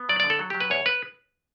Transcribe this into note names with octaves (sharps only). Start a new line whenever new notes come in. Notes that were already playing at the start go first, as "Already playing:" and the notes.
Already playing: B3
F#3 D5
D3 D5
A4
F#3
F#3 G4
B4
E2 C#5
B4